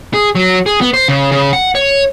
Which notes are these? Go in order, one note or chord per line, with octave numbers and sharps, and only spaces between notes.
G#4
F#3
G#4
B3
C5
C#3
C#3
F#5
C#5